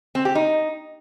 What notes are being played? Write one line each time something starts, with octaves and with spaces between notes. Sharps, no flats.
C4
G4
D#4